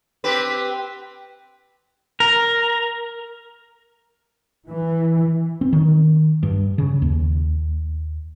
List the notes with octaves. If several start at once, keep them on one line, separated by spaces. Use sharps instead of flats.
C4 G4 B4
A#4
E3
C4
D#3
G2
C#3
D#2